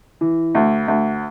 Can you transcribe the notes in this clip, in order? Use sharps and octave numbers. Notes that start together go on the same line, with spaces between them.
E3
D2
D2